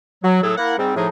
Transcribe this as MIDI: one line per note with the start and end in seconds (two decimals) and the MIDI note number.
0.24 0.39 54
0.42 0.52 45
0.42 0.52 54
0.42 0.52 68
0.42 0.52 69
0.57 0.77 58
0.57 0.77 64
0.57 0.77 70
0.57 0.77 78
0.78 0.95 44
0.78 0.95 55
0.78 0.95 60
0.96 1.08 45
0.96 1.08 53
0.96 1.08 63
0.96 1.08 68